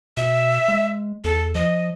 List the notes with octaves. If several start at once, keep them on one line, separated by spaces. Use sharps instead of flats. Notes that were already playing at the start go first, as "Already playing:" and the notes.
B2 E5
G#3
E2 A4
F3 D#5